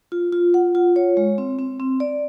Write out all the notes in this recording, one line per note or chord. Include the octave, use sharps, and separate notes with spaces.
F4
F4
F#5
F4
C#5
G#3
C4
C4
C4
D5